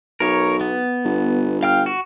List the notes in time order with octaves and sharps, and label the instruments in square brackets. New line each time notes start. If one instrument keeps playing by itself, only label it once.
[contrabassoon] B1 [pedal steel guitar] A#4 C#5
[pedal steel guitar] B3
[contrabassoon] G1
[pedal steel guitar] F5 G5 F6
F#4